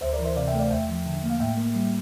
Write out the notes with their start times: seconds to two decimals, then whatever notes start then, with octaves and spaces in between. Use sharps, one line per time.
0.01 D2 C5 E5
0.13 A#4 D5
0.19 E3
0.24 C5 E5
0.36 C3 D5 F5
0.47 E5 G5
0.53 A3
0.59 D5 F5
0.70 E2 E5 G5
0.89 F3
1.06 D3
1.23 A#3
1.30 F5
1.40 A2 E5 G5
1.57 A#3
1.75 G3